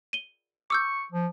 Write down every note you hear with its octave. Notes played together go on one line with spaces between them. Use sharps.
D#7 G7
C#6 D6 E6 G6
F3